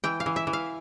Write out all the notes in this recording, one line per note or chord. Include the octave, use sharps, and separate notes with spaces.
E3 G5
F5
E3
E5
E3
F5